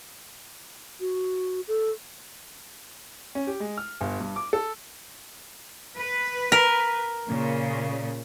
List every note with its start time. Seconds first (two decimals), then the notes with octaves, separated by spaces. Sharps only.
1.00 F#4
1.68 A4
3.35 C#4
3.47 G4
3.60 G#3
3.78 F6
4.01 G1
4.20 G2
4.36 D6
4.53 A4
5.98 B4
6.52 A#4
7.28 A#2 C#3